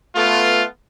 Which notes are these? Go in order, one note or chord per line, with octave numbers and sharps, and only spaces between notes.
A3 B3 F4